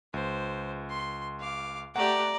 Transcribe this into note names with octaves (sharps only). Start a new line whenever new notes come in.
C#2 C5
C6
F5 D6
A3 G4 D5 F#5 A#5